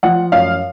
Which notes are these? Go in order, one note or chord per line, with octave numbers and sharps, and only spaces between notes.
F3 F#5
F#2 F5